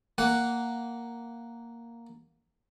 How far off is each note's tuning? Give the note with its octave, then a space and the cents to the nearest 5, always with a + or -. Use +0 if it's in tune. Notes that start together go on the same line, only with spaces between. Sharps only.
A#3 -5 F#5 +0